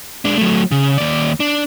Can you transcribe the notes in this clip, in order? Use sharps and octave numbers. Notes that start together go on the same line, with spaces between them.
G#3 D4
F#3 A3
C#3
D#2 D5
D4